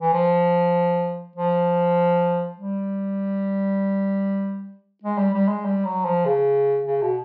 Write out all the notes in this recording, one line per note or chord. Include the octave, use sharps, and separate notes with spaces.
E3
F3
F3
G3
G#3
G3
G3
G#3
G3
F#3
F3
C#3
C#3
B2